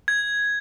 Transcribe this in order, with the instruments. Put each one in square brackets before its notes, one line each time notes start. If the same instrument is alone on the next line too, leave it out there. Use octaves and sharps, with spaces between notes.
[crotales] G#6